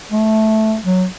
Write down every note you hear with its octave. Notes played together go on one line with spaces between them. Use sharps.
A3
F#3